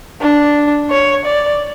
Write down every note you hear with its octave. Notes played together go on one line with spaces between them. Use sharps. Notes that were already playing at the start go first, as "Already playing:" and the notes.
D4
C#5
D5